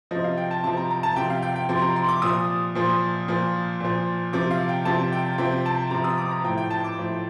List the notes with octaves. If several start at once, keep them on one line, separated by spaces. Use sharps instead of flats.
C3 F3 D#5
F5
G5
A5
C3 F3 A5
A#5
A#5
A5
C3 F3 G5
F5
G5
G5
C3 F3 C6
A#5
C6
D6
A#2 F3 D#6
A#2 F3
A#2 F3
A#2 F3
C3 F3 D6
F5
G5
C3 F3 A5
G5
C3 F3 G5
A5
C3 F3 A#5
D#6
D6
A#5
A2 F3 G5
G5
A5
D6
A2 F3